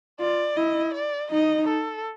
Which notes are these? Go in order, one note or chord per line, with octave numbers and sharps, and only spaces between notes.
F4 D5
E4 D#5
D5
D#4 D#5
A4